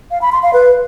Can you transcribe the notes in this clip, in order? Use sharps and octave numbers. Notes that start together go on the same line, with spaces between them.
F5
B5
C6
F5
B4